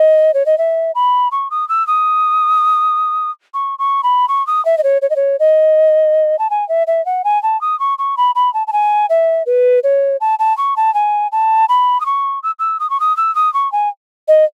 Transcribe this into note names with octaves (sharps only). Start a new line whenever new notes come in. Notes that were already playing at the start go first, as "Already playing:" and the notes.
Already playing: D#5
C#5
D#5
E5
B5
C#6
D#6
E6
D#6
C#6
C#6
B5
C#6
D#6
E5
D#5
C#5
C#5
D#5
C#5
D#5
A5
G#5
E5
E5
F#5
G#5
A5
D#6
C#6
C#6
B5
B5
A5
A5
G#5
E5
B4
C#5
A5
A5
C#6
A5
G#5
A5
B5
D#6
C#6
E6
E6
D#6
C#6
D#6
E6
D#6
C#6
G#5
D#5